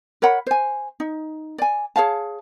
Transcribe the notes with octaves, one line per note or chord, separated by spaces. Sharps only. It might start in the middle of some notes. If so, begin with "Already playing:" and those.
A#4 C#5 F#5 B5
C5 G#5
D#4
D5 G#5
G#4 C#5 F5 A5